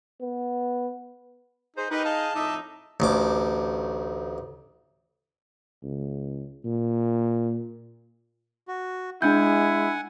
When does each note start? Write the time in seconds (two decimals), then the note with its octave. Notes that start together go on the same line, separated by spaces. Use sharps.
0.22 B3
1.77 D#4 G#4 C5
1.90 D#4 G4 A#4 B4
2.05 G#4 D#5 F5 A5
2.35 F2 A2 D#4 D#5 E5 D6
3.00 A1 D2 D6
5.84 C#2
6.65 A#2
8.68 F#4
9.22 G#3 D4 E4 F#5 G#5 G6